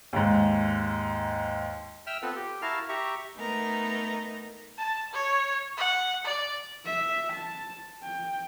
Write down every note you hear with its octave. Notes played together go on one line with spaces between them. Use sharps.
D#2 G#2
E5 G5 E6 F6
B3 C4 F4 A4 B4
G4
E4 F#4 A#4 F5 A5 F6
G4 E5 A#5 C#6
A3 B3 D#4 A#4
A5
C#5
F#5
D5
E5
A5
G5